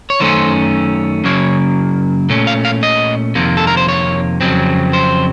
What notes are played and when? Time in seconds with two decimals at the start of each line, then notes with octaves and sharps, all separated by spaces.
0.10 C#5
0.20 F#2 D#3 A3 C#4 C5
1.24 F#2 C#3 F#3 A#3 C#5
2.30 A#2 A3 C#4
2.47 F5
2.65 F5
2.83 D#5
3.35 F2 C3 D#3 A#3
3.57 A4
3.67 A#4
3.77 C5
3.88 C#5
4.41 F2 C#3 F#3 C4
4.93 C5